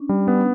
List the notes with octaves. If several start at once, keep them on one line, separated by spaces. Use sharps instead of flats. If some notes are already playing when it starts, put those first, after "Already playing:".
Already playing: C#4 D4
G3
B3